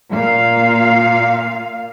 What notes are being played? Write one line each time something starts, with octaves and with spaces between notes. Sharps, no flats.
A#2 F5